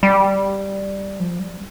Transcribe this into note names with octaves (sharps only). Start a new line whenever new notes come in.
G3
F3
G3